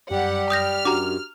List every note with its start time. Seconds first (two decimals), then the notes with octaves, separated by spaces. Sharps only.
0.11 F#2 G3 G4 F#5
0.50 D#6 F6 G6 A#6
0.85 F#2 D4 F#4 G4 A#5 D6